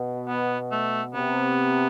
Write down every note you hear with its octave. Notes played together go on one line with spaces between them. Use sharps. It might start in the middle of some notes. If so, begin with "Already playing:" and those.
Already playing: B2
B3
A3
C3 B3